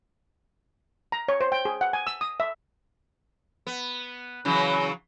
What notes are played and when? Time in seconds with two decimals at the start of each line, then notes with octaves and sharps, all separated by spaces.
1.12 A#5
1.28 C#5
1.41 C5
1.52 G5
1.65 G#4
1.81 F#5
1.93 G#5
2.07 E6
2.21 D#6
2.40 E5
3.67 B3
4.45 C#3 E3 F#3